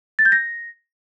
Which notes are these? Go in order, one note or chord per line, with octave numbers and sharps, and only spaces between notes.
A6
G6
A#6